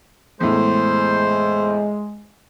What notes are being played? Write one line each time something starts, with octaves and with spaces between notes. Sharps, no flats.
E2 A2 G#3 C5